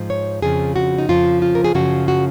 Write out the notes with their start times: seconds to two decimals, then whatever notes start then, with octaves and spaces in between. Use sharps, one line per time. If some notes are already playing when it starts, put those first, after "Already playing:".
Already playing: G#2 F3
0.10 C#5
0.42 F2 C#3 F3 G#4
0.76 F#4
0.98 D#4
1.09 F2 C#3 F3 F4
1.42 F4
1.55 A#4
1.64 G#4
1.75 F#2 C#3 F3 F#4
2.08 F#4